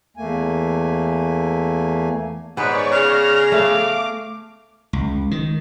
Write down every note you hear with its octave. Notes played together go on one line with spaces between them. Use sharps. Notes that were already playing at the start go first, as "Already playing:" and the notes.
E2 A3 A#3 G#5
G#2 B3 B4 C#5 D5 C#6
C#3 F6 A#6
A3 F5 D6
C#2
D#3